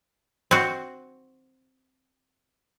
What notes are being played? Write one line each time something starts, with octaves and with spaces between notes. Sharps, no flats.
C4 F#4